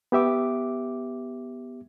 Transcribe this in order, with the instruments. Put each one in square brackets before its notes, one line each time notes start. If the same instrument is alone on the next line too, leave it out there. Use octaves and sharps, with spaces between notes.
[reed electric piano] B3 G4 E5 D6